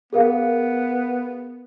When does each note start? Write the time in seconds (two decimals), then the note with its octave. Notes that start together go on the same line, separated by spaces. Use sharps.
0.13 B3 G#4 A#4 F5